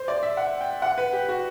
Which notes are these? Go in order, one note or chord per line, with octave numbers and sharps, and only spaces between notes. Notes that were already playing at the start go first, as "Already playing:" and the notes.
Already playing: C5
D5
E5
F#5
G5
F#5
B4
G4
F#4